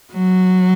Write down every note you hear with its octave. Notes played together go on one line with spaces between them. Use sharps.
F#3